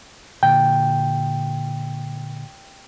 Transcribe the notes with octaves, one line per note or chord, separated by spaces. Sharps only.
A#2 D3 G5